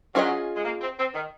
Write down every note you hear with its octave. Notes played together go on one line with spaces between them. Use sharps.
F#3 C#4 F4 G#4 C5 D#5
G#3
A#3
C4
C4
D#3